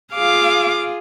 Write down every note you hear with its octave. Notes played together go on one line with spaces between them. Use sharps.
F4 G#4 F5 D6